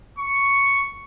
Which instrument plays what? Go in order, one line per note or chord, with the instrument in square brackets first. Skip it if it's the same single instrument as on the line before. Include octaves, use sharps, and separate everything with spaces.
[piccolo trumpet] C#6